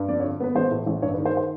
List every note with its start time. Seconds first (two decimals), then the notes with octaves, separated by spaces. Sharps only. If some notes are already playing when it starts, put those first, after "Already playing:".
Already playing: G2
0.08 F2 D5
0.20 C#5
0.24 D3
0.40 B3 B4
0.55 A1 C5
0.71 A2
0.86 A1
1.02 G2 C#5
1.14 B4
1.18 D#3
1.26 C5
1.37 C5